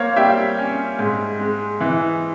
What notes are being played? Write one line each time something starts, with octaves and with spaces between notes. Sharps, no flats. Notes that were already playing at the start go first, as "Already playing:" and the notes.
Already playing: A#3 C5 C#5 F5
G3 E5 G5
C#4
G#2
G#3
E3